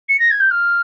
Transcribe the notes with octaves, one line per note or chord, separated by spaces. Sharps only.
C#7
A#6
G#6
G6
F6